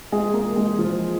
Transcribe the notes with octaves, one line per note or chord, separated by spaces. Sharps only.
G#3 G#4
A#3 A#4
G#3 G#4
F3 F4